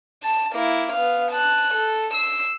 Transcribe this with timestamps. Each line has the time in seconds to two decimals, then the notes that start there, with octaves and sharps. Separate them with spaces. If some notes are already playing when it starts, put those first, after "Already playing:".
0.23 A5
0.53 A#3 E4
0.92 B3 F5
1.31 A5 F#6
1.74 A4
2.14 E6 C7